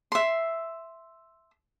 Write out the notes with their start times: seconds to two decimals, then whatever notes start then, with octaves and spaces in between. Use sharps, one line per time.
0.12 E5 C6